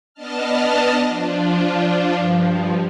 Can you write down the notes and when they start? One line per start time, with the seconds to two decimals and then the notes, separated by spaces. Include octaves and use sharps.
0.14 B3 D4 D#5 A5 F6
1.05 F3 D4 F4
2.16 G2 F3